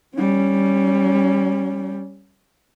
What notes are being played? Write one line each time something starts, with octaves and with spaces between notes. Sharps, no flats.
G3 C#4